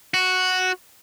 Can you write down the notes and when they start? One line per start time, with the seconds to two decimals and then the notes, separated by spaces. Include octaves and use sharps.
0.14 F#4